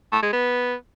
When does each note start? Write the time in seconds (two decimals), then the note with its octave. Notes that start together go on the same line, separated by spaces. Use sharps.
0.12 A3
0.22 G#3
0.33 B3